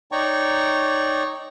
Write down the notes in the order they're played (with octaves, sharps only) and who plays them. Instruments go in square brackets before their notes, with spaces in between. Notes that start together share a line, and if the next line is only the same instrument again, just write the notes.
[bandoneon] D#4 C#5 D5 G5 A#5 C#6